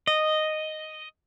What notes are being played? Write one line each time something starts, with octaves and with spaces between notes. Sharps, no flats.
D#5